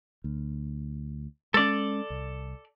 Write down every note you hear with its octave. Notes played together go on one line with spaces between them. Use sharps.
D2
G#3 C#4 A4 D5
C2